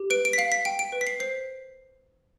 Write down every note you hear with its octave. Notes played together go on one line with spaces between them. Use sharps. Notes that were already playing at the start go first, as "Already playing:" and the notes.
Already playing: G4
B4 D7
D7
B6
F5 C7
B6
G5 D7
D7
B4
B6
C7
C5 C7